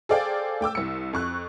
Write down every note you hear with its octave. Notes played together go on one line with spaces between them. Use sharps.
G#4 A4 C5 D5 F5 G5
A3 G5 D6 E6
C2 C#7
F2 C#6 F#6